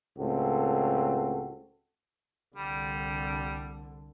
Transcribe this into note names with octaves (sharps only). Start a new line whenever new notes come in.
C#2 A2 C4 F#4 A4
C2 D3 G3